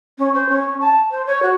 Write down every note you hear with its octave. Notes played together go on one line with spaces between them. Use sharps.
C#4
C5
C#4
A5
C5
C#5
F#4